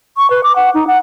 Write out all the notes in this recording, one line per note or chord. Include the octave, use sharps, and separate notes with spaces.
C#6
B4
D6
F#5
D#4
F#5